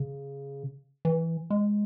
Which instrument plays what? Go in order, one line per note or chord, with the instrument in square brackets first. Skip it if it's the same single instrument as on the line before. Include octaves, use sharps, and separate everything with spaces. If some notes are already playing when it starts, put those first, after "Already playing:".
Already playing: [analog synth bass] C#3
E3
G#3